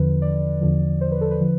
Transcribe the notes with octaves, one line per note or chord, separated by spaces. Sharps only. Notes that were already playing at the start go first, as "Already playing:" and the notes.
Already playing: E2 D3 F3 B4
D5
E2 D3 F3
C5
B4
A4
B4
D3 F3